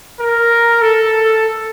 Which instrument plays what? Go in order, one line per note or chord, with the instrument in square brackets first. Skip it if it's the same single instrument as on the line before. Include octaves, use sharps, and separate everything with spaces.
[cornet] A#4
A4